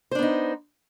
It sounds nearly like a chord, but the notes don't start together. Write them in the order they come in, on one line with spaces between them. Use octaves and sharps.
C5 D4 B3 D#4